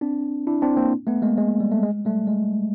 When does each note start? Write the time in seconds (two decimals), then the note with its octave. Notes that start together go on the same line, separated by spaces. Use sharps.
0.01 C4 D4
0.47 D4 E4
0.62 C4 D4
0.77 A#3 C4
1.07 A3 B3
1.22 G#3 A#3
1.37 G#3
1.60 G3
1.71 A3
1.83 G#3
2.05 G3 A3
2.27 G#3